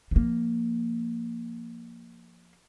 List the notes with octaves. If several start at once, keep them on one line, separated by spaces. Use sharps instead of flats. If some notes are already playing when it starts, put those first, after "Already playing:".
F3 A#3